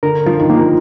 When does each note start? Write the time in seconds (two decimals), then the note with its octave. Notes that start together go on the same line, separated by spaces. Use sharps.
0.03 D3 A#4
0.26 F3 F4
0.40 D#3
0.49 F3 A#3